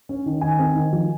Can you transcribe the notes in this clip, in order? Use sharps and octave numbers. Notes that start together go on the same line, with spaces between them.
C#4
D#3
D#3 G#5
C4
D#3
F3